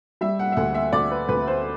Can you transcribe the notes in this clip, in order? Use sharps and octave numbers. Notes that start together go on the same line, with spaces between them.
G3 E5
F#5
E5
D2 F#5
E5
D2 D5
B4
D2 B4
C5